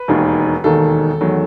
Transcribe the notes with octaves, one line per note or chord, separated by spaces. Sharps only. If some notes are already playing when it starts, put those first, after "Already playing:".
Already playing: B4
E1 D#2 D#3
E1 D#2 D#3 A4
E2 D#3 F#3 A3